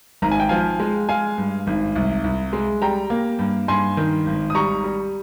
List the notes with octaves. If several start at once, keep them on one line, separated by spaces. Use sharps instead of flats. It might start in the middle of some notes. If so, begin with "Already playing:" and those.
G#1 A#5
G#5
G5
F3 F5 G#5
G#3
G#3 F5 G#5
G2
G#1
C2
C2
G#3
G3 G5 A#5
A#3
G2
G2 G#5 C6
D#3
G#1
D#6
G3 A#5 C#6
G3